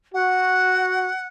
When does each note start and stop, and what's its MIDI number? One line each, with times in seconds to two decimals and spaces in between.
0.14 1.09 66
0.14 1.27 78